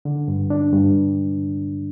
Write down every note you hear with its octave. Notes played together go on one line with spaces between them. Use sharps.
D3
G2
D4
G2